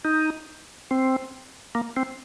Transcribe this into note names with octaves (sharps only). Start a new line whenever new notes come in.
D#4
C4
A#3
C4